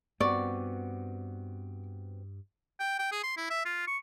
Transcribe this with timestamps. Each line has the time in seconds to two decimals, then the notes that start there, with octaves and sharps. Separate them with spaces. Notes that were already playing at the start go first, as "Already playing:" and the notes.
0.21 G2 B3 C4 F#4 D5 C#6
2.79 G5
2.99 G5
3.12 G#4
3.23 C6
3.37 E4
3.50 E5
3.65 F4
3.87 C#6